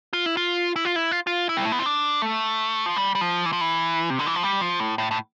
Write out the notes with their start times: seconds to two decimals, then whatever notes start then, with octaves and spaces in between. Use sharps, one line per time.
0.13 F4
0.26 E4
0.37 F4
0.76 E4
0.85 F4
0.96 E4
1.11 F4
1.27 F4
1.49 E4
1.57 G3
1.65 A3
1.72 B3
1.79 C4
1.86 D4
2.22 A3
2.86 F3
2.96 G3
3.15 G3
3.21 F3
3.46 E3
3.53 F3
3.61 E3
4.10 C3
4.19 D3
4.27 E3
4.35 F3
4.43 G3
4.61 F3
4.80 A2
4.98 A2
5.11 A2